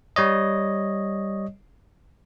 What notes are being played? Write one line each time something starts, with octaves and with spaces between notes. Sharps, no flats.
G3 C#5 D#5